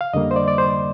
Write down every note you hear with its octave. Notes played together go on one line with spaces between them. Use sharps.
F5
F2 D3 G3 A#3 D#5
C5
D5
D5
C5